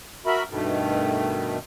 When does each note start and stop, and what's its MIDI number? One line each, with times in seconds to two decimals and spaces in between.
0.26 0.43 66
0.26 0.43 70
0.26 0.43 76
0.26 0.43 83
0.50 1.58 43
0.50 1.58 47
0.50 1.58 51
0.50 1.58 57